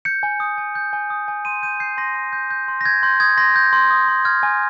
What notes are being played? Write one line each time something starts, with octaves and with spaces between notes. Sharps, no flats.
G6 C#7
G#5
D#6
G#5
G6
G#5
D#6
G#5
C6 D#7
G6 D#7
G6 C7
C6 A#6
C6
G6
G6
C6
A#6
G6 G#6
C6 G6
D#6 G#6
C6 A#6
G6
C6
D#6
C6
F6 G#6
G#5